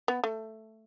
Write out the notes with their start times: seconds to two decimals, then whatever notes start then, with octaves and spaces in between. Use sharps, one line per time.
0.08 B3
0.24 A3